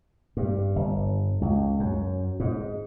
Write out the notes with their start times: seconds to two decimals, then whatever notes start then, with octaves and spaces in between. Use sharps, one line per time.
0.37 G2
0.76 G1
1.41 C#2
1.80 F#2
2.40 G#2